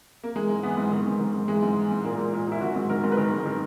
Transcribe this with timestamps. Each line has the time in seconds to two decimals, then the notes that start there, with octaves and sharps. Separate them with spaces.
0.24 A#3
0.35 E3 G#3
0.49 G#2
0.63 E3 B3
0.77 G#2
0.92 D#3
1.07 G#2
1.20 D#3
1.34 G#2
1.48 E3 G#3
1.63 G#2
1.77 E3
1.91 G#2
2.05 A#2 A#3
2.19 A#2
2.33 A#2
2.48 A#2 E4
2.61 D#3 F#4
2.75 G#2
2.89 D#3 A#4
3.04 G#2
3.12 B4
3.17 D#3 A#4
3.31 G#2
3.46 D#3